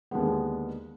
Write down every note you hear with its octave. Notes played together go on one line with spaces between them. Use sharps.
D#2 D3 G#3 B3